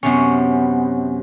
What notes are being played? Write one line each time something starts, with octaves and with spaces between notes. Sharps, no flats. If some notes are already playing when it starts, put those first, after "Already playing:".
F#2 C3 B3 C#4